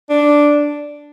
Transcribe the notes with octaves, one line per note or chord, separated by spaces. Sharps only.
D4